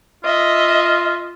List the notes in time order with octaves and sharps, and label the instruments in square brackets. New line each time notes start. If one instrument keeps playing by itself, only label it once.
[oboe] F4 [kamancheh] D#5 E5